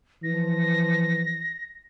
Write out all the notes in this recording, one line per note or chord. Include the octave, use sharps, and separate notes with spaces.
E3 F3 A#6